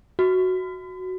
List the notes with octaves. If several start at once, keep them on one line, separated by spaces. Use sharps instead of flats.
F#4